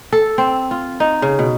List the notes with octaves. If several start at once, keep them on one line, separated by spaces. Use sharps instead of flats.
A4
C4
F4
D#4
C#3
B2